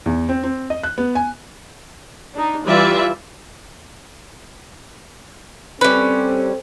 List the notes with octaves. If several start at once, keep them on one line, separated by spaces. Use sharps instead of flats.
E2
C4
C4
D#5
F#6
B3
G#5
D4 D#4
E3 G3 F4 D5 E5
G3 C4 C#4 A4 B4